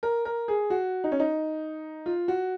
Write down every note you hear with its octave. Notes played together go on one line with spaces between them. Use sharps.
A#4
A#4
G#4
F#4
D#4
C#4
D#4
F4
F#4